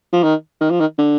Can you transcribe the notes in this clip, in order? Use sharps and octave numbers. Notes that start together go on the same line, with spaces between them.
F3
D#3
D#3
F3
D#3
D3